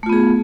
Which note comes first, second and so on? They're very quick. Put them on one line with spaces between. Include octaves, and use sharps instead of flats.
A3 F4 B3 G#4